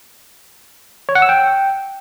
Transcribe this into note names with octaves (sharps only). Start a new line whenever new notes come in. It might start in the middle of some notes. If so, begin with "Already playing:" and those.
C#5
F#5
E6
G5